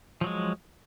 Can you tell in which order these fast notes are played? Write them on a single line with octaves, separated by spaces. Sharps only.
F3 F#3 G#3